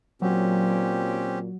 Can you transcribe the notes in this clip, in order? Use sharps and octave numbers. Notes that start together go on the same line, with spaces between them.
A#2 F#3 C4 C#4 G4